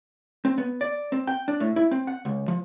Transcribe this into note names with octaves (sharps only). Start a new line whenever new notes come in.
C4
B3
D5
C4
G5
D4
A2
E4
C4
F#5
C#2
F3